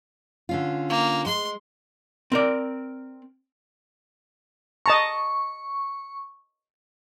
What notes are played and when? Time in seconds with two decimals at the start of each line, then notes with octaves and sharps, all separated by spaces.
0.49 D3 C#4 F4
0.89 A#3
1.26 G#3 C6
2.32 C4 A#4 D5
4.86 D#5 A5 A#5 C#6